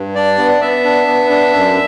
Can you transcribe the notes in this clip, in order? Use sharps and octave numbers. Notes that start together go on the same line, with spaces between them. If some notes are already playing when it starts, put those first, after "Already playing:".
Already playing: G2
D4 D5
B3
B3 E5
D4
B3
D4
F#2